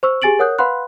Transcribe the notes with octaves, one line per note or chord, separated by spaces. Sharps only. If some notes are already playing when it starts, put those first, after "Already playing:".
C5 C#6 E6
G4 G#4 G#5 A6 D7 F#7
A#4 C#5 F#5 D#6 F#6 G6
B4 F5 F#5 B5 C6 F#6